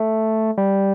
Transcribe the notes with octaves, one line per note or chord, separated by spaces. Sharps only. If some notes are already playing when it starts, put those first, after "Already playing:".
Already playing: A3
G3